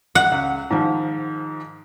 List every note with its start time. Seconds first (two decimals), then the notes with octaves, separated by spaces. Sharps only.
0.15 F#5
0.32 C#2
0.70 G#2 D#3 F3